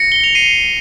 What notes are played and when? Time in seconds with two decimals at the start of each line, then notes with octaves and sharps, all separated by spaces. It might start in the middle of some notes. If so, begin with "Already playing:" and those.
Already playing: A#6 C#7
0.12 G7
0.24 F7
0.35 C7 D#7